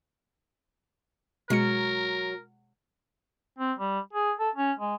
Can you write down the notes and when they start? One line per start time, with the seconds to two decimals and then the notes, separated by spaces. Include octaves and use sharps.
1.50 B2 F#3 G#3 A#4 C#7
3.59 C4
3.79 G3
4.13 G#4
4.40 A4
4.55 C#4
4.79 G#3